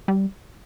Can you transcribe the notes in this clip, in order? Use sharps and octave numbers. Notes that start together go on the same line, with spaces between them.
G3